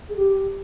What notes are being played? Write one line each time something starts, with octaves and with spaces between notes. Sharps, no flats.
G#4
G4